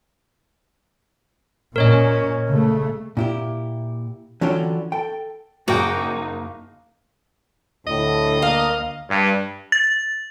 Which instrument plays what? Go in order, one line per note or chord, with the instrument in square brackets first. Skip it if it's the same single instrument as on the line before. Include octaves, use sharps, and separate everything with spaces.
[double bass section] A#2 C#4 [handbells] A#4 C#5 D#5
[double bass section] C#3 A3
[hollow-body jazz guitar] A#2 E4 G4
D3 E3 F#3 C#4 F4 G5
A4 G5
[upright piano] F#1 G#4 [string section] F#2 D#4 [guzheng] A#3 [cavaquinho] F#4 G5
[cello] D2 [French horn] A2 [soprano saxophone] D#5
[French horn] A#3 [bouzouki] F5
[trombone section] G2
[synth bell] A6